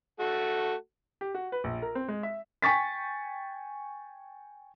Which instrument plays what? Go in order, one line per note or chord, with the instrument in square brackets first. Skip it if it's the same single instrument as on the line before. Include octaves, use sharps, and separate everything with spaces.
[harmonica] A3 F#4 A4
[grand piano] G4
F#4
B4
A#1
A#4
C4
G#3
E5
[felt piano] G5 G#5 C#6 A6 B6